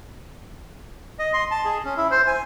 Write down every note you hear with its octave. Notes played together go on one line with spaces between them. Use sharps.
D#5
C6
A5
G#4
C#4
E4
C5
G#5